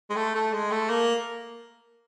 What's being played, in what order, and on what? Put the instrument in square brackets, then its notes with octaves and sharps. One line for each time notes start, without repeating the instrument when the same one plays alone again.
[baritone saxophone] G#3
A3
A3
G#3
A3
A#3